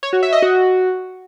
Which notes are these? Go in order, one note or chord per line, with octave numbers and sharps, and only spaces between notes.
C#5
F#4
E5
D#5
F#4